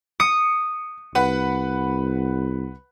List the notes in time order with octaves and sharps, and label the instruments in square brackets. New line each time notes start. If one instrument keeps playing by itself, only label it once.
[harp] D#6 [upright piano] C#7
[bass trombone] C2 [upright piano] B4 F#5 B5